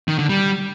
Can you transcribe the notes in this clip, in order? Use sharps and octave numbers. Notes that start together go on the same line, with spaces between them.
D#3
D3
G3